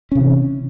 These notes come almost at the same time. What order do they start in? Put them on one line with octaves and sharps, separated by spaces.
C#4 C3 E3